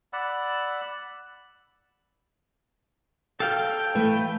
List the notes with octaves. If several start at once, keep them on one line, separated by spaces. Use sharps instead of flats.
D5 F#5 B5 E6
A4 F5 G5 F6
E3 A3 B4